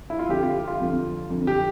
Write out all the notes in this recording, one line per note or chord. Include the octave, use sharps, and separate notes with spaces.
E4
F4
F2 D3 F3 G4
F4
G4
F4
F2 D3 F3
F2 D3 F3
G4